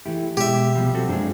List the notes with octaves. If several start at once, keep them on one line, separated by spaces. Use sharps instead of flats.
E3 A3 E4 G4
B2 G#3 G4 E5
C2 F3 G3
C4 F#4 A4
F#2 G#3 D4 F4 C5